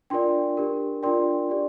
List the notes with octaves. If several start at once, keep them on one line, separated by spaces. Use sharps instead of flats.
D4 F4 A#4 D5 G5 C6
D4 G4 A#4
D4 F4 A#4 D5 G5 C6
D4 G4 D5